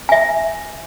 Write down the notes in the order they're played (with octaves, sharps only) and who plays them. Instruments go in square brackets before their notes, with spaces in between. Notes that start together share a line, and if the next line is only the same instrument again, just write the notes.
[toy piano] E5 G#5